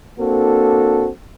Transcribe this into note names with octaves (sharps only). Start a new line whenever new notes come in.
A#3 C4 D4 F#4 A4